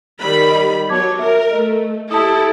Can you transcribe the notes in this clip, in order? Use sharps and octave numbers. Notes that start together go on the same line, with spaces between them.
D#3 G3 B5
D#5
F#3 B3 C#5 A5 D6 G#6
A#4 E5
A3 D#5
E4 G4 A4 A5 D#6